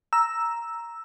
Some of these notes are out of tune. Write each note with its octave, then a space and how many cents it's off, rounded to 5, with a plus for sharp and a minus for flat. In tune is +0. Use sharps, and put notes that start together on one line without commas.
A#5 +0 E6 +0